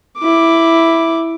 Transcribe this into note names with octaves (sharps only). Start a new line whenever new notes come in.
E4 D6